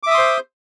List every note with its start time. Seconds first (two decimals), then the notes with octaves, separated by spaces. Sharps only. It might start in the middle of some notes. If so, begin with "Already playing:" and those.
0.03 D6
0.07 E5
0.11 D#6
0.14 C6
0.18 C5